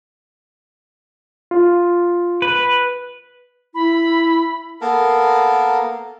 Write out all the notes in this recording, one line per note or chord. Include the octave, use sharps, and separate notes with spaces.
F4
B4
E4 B5
A#3 B3 A4 A#4